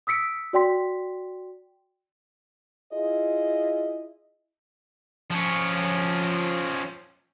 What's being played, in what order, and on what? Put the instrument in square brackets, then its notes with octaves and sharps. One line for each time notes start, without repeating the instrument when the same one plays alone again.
[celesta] D#6 E6 B6 C#7 D7
F#4 D5 G5 C6 B6
[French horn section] E4 F4 G#4 D#5
[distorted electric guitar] F3 C#4